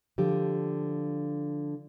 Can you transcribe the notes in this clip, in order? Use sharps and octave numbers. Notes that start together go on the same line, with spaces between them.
D3 F3 G4